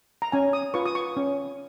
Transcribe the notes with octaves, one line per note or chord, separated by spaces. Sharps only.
A#5
C#4 G#5
D#6
F4 B4 C#6
D#6
C#6
C#4